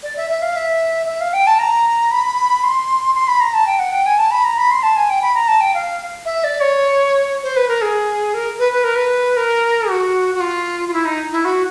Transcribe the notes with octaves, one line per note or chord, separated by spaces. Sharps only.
D5
E5
E5
F5
E5
E5
F5
G5
A5
A#5
B5
C6
C6
B5
A#5
A5
G5
F#5
G5
G#5
A5
B5
A#5
B5
C6
A5
G#5
G5
B5
A#5
A5
G5
F5
E5
D5
C#5
C5
B4
A#4
G#4
A#4
B4
B4
A#4
B4
A#4
F#4
F#4
F4
F4
E4
D#4
E4
F#4